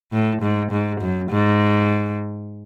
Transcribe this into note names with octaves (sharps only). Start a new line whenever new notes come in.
A2
G#2
G#2
F#2
G#2